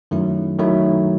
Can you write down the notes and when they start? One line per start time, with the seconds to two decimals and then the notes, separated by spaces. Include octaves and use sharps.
0.11 F#2 D#3 F#3 A3 E4
0.59 D#3 F#3 A3 E4